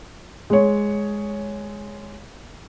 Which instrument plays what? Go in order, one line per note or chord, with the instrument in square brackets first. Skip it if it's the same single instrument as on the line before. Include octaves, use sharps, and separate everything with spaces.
[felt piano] G#3 C#5